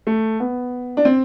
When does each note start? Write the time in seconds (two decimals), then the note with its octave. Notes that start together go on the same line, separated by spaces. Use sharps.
0.07 A3
0.40 B3
0.97 D4
1.05 C4